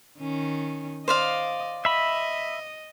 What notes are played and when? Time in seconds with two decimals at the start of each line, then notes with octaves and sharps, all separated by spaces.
0.20 D#3 C#4
1.08 C5 D5 D#5 F5
1.85 D#5 E5 B5